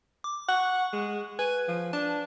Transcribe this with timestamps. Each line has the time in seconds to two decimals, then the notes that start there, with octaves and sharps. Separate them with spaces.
0.24 D6
0.49 F#5 C#6
0.93 G#3
1.39 B4 G#5
1.68 F3
1.93 D4 A5